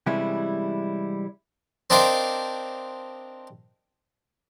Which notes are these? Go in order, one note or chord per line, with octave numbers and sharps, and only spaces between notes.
C3 E3 G3 G#3 C#4 E4
C4 D4 D#4 A#4 C5 F5